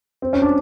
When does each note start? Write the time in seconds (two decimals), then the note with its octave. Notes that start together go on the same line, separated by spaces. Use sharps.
0.22 C4
0.33 C#4
0.42 D4